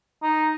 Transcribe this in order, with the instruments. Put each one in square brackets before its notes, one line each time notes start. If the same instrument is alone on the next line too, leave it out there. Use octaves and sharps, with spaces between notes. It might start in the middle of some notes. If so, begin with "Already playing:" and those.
[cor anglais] D#4